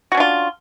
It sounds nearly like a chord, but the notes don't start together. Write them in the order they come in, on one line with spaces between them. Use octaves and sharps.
F#4 C#4 D4 F4